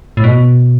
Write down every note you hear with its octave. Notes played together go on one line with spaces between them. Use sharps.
A2
B2